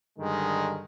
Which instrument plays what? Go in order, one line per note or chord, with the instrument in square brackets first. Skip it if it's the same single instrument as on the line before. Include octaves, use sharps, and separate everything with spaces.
[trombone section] G2 D3 D#3 G#3